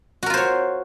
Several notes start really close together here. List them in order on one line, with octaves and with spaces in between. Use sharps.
F#4 A#4 F4 C5 C#5